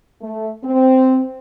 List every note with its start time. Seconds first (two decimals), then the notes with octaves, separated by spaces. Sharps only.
0.21 A3
0.64 C4